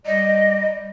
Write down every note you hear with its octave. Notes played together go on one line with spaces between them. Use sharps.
G3 D5 D#5